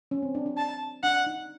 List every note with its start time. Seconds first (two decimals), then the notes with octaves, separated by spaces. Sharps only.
0.11 C#4
0.22 C4
0.35 D4
0.46 D4
0.57 A5
1.03 D4 F#5
1.26 D#4